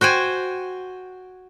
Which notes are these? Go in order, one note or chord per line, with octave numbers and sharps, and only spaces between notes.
F#4 C5 G5 G#5